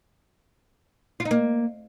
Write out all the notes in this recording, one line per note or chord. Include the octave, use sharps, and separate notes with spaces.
F4
D#4
A#3